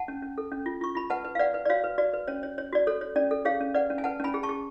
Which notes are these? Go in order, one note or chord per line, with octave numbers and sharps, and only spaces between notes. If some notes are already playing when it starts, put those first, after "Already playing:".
Already playing: F#5 A5
C#4
C#4
A4
C#4
F4
F4 C#6
F4 B5
B4 F#5 A5
B4
F5
B4 D5 F#5
B4
D5
F#4 C#5 F5
B4
F#4 D5
B4
C#4 C#5
C#5
C#5
F#4 D5
A4 C#5
C#5
C#4 D5
A4
G#4 C#5 F5
C#4
B4 D5 F#5
C#4
G#5
B4 F#5 A5
C#4 G#5 B5
G#4
A5 C#6
G#4